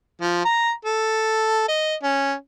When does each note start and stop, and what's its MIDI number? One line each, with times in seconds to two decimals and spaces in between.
0.21 0.43 53
0.45 0.71 82
0.85 1.63 69
1.68 1.95 75
2.03 2.34 61